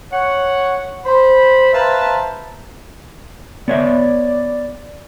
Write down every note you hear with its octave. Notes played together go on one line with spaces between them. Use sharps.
C#5 F#5
C5 B5
B4 C5 E5 F5 A5 A#5
B3 C#5 D5 E5